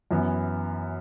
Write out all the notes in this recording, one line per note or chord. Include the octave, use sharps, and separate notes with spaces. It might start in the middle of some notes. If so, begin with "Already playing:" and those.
F#2 E3 B3